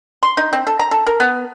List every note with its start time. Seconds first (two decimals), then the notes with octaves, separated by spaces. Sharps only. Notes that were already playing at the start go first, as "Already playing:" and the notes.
0.23 C6
0.37 D#4
0.53 C4
0.67 A4
0.79 A#5
0.91 A4
1.07 A#4
1.20 B3